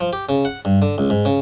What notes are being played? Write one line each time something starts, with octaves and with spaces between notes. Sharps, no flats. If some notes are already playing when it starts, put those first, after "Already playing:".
F3
G4
C#3
F#5
G2
D3
C#2
G#2
C#3